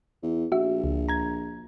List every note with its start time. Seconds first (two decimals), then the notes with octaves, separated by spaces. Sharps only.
0.22 E2
0.52 A#1 F#4 E5
0.84 C#2
1.09 A#5 G#6